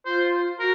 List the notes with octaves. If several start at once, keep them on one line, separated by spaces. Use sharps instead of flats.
F4 C5
F#4 A#4